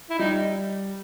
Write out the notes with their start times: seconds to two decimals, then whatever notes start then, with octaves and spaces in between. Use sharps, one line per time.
0.10 E4
0.19 G3 D#4